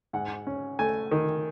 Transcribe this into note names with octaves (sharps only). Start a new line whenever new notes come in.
G#2 F#5
C#4
A3 G#5
D#3